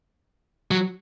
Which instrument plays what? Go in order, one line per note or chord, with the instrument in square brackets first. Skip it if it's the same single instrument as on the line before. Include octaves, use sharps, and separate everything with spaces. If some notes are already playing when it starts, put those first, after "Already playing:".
[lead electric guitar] F#3